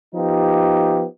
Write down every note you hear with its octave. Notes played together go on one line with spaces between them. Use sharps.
F3 B3 D#4 G4